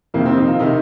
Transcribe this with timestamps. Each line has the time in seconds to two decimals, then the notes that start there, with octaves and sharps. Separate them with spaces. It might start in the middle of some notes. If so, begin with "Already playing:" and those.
0.14 F2 C3 D#3 A#3
0.26 C4
0.37 D#4
0.48 F4
0.59 C3 D#3 D#4